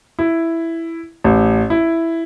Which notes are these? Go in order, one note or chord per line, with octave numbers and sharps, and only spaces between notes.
E4
A1
E4